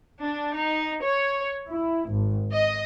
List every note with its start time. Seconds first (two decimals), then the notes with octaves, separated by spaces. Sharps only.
0.23 D4
0.57 D#4
1.03 C#5
1.70 E4
2.11 G#1
2.51 D#5